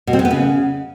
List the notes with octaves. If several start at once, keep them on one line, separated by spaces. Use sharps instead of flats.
B2
C4
G#3
B3
C#3